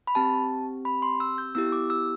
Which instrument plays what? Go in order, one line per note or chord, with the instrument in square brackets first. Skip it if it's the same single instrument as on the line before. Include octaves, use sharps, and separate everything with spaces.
[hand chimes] B5
C4 G4 A5
B5
C6
E6
G6
B3 E4 G4 E6
D6
E6